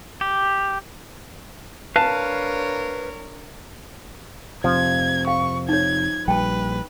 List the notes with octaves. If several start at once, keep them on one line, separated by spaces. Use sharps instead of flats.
G4
D4 A#4 B4 C#5 F5 A5
F2 C3 F3 G#6
F5 C#6
D#4 C#5 G#6
A#1 G3 B4 G5 A5